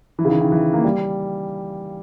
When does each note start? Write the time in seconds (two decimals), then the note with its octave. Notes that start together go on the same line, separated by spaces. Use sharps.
0.19 E3
0.25 C#3
0.30 D#3
0.40 D#3
0.52 E3
0.73 A#3
0.84 G3